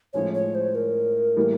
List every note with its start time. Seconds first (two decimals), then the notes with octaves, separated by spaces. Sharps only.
0.13 A2 F3 G#3 C#4 C#5
0.34 C#5
0.55 C5
0.75 A#4
1.36 A2 E3 G3 A#3